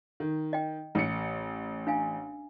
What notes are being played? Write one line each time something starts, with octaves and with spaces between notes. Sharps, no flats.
D#3
D#5 G5
A1 C#7
D4 F5 G#5